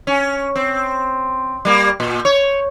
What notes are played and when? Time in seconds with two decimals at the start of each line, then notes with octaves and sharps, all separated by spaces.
0.07 C#4
0.56 C4
1.65 G3 A#3
2.00 A#2
2.25 C#5